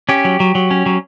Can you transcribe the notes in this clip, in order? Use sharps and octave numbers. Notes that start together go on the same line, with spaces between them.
C#4 G4
F#3
F#3
F#3
C#4
F#3